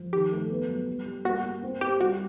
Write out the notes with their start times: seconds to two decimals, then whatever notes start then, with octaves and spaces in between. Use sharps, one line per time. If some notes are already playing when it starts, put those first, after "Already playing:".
Already playing: F3
0.13 D#3 G4
0.32 A3
0.50 B3
0.69 F#3
0.87 G3
1.06 G3
1.25 A#3 F#4
1.43 A#3
1.63 C4
1.81 C4 G4
2.00 G3 F#4